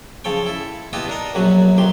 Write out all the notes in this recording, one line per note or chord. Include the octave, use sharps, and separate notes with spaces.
C#3 F3 A4 C#5 G5
E4 A4
B3 E4 F4 G4 D#5 A5
D4 D#4 A#4 D#5
A#1 F#2 B2 F#3 F#4
B1 F2 D#3 G4 C6